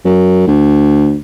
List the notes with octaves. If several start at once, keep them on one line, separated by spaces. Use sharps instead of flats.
F#2
D2